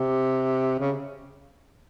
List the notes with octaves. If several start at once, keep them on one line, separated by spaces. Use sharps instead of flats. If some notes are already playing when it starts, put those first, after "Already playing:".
Already playing: C3
C#3